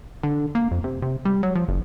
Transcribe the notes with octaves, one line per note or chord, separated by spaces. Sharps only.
D3
A#3
F2
C3
C3
G3
F#3
F3
F#1